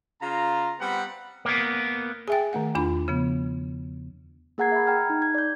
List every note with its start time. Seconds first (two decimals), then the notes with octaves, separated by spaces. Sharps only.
0.21 C#3 F4 A#5
0.80 G3 B3 C4 F#5 B5
1.45 A#3 B3
2.28 G#4 E5 G5 G#5 A6
2.53 D#3 A3 F#5
2.75 E2 D4 F4 B5
3.08 C#3 F3 B3
4.58 A#3 G#4 F#5 A#5 G#6 C7
4.72 E5 B5
4.87 G5 A#5 F6 G#6
5.10 D#4
5.22 G#6
5.35 D5 G6